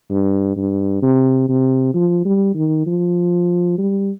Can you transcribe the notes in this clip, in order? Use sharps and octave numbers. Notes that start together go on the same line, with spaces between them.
G2
G2
C3
C3
F3
G3
D#3
F3
G3